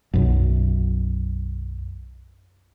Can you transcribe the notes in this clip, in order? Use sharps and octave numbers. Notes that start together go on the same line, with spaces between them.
B1 F#2